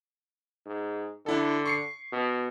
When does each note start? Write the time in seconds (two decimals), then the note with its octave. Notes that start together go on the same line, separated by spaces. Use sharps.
0.66 G#2
1.26 D3 D4 E4 A4
1.66 C#6 C7 C#7
2.12 B2